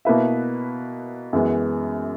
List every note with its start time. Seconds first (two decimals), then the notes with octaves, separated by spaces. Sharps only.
0.05 B2 A#3 E4 B4 E5
1.33 F#2 E3 G#3 B3